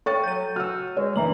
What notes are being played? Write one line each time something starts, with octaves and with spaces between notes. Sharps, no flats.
A4 C#5 G5 C#6 A6
F#3 G6 D#7
F#4 E6 F6
G#3 C#5
F#1 E3 D4 E5 A#5 F#7